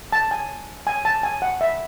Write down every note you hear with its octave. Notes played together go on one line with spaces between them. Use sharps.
A5
G#5
G#5
A5
G#5
F#5
E5